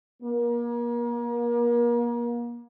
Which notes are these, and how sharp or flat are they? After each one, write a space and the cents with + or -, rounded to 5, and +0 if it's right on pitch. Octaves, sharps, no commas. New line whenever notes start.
A#3 +35